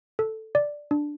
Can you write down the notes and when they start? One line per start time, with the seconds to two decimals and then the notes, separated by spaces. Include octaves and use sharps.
0.19 A4
0.55 D5
0.91 D4